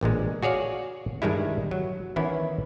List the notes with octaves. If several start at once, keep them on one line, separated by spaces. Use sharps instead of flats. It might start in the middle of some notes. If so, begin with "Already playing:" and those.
A1 A#2 D3 G#3
F#4 G#4 C#5 D5 F5
G2 D#3 G3 G#3 E4
F#3
D#3 E3 B3 C#4 E4